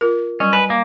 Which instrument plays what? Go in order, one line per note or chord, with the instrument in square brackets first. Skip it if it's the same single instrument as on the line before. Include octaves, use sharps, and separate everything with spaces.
[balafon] F4 A#4
[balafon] F#3 G3 [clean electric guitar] C#4
[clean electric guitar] B4 [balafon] G#5
[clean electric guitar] A#3